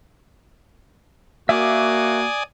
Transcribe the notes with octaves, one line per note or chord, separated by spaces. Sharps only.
A#3 F#4 D5 E5 G#5 D6 D#6